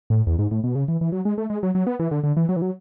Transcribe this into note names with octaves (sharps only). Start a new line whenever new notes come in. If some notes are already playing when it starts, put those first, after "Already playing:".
A2
E2
G#2
A2
B2
C#3
E3
E3
F#3
G#3
A3
G#3
F#3
F#3
B3
E3
D3
D3
E3
F#3
E3
F#3